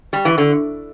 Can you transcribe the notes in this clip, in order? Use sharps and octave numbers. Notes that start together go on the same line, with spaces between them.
G3
E3
D3